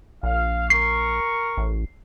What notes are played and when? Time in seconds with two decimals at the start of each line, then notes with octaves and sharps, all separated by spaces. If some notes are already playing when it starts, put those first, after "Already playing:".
0.23 A#1 F5
0.70 A#4 C#6 C7
1.57 A1